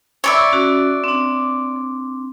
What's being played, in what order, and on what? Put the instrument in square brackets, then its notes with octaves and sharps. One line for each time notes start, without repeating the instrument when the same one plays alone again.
[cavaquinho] C#5 D5 E5 [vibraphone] B5
[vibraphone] C#4 F#4
C4 D4